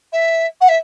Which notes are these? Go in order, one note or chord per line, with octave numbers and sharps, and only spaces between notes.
E5
F#5
E5